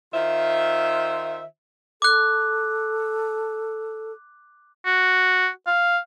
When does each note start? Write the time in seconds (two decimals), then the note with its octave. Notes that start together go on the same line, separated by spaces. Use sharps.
0.14 D#3 F4 C5 E5
2.02 A4 D6 F#6
4.85 F#4
5.67 F5